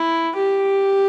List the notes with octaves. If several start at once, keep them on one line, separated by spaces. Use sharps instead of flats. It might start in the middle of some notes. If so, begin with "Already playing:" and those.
Already playing: E4
G4